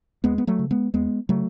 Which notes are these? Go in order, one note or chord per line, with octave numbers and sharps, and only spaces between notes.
D#2 G#3 B3
B3
F#3 A3
C#3
G#3 B3
D#2 G#3 B3
C#3 F#3 A3